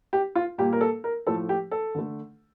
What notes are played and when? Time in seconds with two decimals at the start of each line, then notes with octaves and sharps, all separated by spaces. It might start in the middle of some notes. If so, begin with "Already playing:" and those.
0.13 G4
0.35 F4
0.58 A#2 G3 A#3 G4
0.73 A#4
0.81 A4
1.04 A#4
1.27 A2 F3 A3 A4
1.49 G4
1.71 A4
1.95 D3 A3